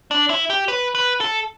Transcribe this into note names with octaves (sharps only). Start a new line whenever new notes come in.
D4
E4
G4
B4
B4
A4